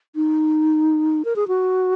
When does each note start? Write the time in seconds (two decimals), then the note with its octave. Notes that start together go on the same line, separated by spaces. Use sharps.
0.16 D#4
1.25 A#4
1.36 G#4
1.48 F#4